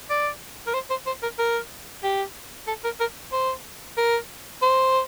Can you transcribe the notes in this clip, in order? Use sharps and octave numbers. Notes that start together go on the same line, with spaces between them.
D5
A#4
C5
C5
C5
A#4
A#4
G4
A4
A#4
A#4
C5
A#4
C5